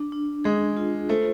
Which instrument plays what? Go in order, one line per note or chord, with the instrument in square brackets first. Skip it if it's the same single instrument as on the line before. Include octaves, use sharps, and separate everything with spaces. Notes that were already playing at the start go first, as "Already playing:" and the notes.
Already playing: [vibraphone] D4
D4
[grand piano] G#3 [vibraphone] G#4
[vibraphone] F4
[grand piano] A3 [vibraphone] C5